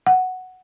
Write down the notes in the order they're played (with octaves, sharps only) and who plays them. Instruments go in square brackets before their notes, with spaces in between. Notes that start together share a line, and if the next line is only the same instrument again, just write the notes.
[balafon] F#5